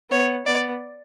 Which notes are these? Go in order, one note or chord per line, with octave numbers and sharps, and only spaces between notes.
B3 C#5
B3 D5